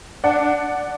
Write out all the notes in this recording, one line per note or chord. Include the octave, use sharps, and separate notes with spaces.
D4 D5 F#5
D4